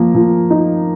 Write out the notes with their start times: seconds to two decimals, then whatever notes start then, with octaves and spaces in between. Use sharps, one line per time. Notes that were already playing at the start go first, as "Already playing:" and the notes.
Already playing: F3 A#3
0.15 F3
0.50 D#4